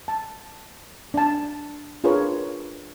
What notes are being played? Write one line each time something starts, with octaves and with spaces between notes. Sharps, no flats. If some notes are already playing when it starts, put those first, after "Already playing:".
A5
D4 A5
D4 F4 G#4 A#4 B4 C#5